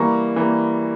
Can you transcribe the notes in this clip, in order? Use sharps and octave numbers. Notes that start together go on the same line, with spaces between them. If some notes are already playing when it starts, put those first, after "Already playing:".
Already playing: E3 G3 A#3 A#5 C#6
E3 G3 A#3